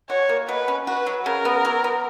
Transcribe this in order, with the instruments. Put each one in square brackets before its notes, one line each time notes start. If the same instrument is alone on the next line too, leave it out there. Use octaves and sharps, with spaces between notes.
[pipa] F#4 [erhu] C#5
[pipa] A#3
[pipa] B2 [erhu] B4
[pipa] C#4
[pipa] F#4 [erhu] B4
[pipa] F#3
[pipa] C#3 [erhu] A#4
[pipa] B3
F#3
B3